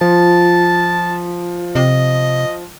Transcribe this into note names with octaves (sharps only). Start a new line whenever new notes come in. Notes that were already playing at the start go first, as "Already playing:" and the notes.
F3 F4 A5
C3 D#5